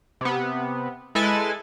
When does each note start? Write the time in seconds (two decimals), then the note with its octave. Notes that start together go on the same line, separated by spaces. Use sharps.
0.21 C3 B3
1.15 G#3 E4 A4 B4 G#5 A6